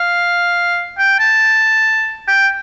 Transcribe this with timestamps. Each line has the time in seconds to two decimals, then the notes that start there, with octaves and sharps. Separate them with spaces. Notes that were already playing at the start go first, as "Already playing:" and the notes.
Already playing: F5
0.98 G5
1.20 A5
2.28 G5